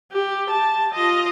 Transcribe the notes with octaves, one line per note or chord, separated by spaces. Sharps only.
G4
A5
F4 D#5